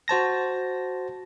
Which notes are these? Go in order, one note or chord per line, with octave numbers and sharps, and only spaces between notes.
F#4 C5 A5 A#6